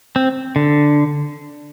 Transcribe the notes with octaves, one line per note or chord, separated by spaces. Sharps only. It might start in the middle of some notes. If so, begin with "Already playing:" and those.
C4
D3